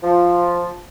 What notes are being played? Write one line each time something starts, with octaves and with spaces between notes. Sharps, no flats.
F3